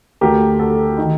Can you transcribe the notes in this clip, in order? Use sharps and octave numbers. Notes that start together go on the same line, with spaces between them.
D2 D3 A3 G4 A#4
F#4 A4
D#3 D#4